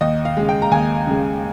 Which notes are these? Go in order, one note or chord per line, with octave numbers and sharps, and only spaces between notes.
D#2 D#5
F5
C#3 G#3
G5
A#5
D#2 G#5
C#3 G#3